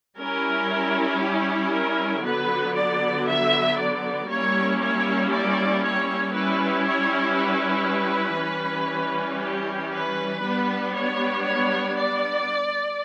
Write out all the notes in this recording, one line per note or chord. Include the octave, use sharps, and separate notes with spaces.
G3 C#4 E4 A#4
G4
A#4
D3 F#3 B3 B4
D5
E5
D5
G3 A#3 C#4 E4 C#5
C#5
D5
C#5
G3 C#4 E4 B4
C#5
B4
E3 G3 C#4
G4
B4
G3 B3 D4
C#5
C#5
D5